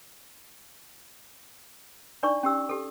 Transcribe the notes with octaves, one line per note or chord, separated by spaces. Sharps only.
D4 D#4 D5 C#6
C#4 G4 E6
G4 A4